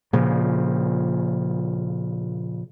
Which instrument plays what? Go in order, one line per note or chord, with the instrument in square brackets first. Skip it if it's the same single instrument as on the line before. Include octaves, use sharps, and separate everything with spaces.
[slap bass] A#2 C#3 F3